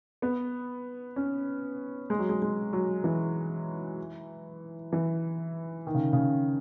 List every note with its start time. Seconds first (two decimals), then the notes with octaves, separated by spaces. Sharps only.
0.22 B3
1.16 C#4
2.10 G#3
2.19 F#3
2.29 G#3
2.42 G#3
2.73 F#3
3.04 E3
4.93 E3
5.87 D#3
5.94 C#3
6.13 C#3